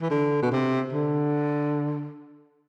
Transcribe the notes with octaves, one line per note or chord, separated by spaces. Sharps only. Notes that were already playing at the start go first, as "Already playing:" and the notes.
E3
D3
B2
C3
D3